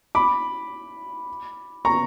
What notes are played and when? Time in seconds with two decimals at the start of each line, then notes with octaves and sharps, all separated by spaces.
0.15 B5 D6
1.85 A#5 C#6